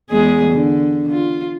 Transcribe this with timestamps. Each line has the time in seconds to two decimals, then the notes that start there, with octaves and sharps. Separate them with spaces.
0.11 E2 G#3 G#4
0.51 D3
1.12 F4